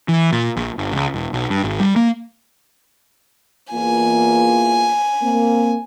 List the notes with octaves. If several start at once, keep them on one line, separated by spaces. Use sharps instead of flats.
E3
A#2
A#1
G1
C#2
E1
B1
G2
G#1
G3
A#3
E2 A#3 F4 G#5
A#3 C4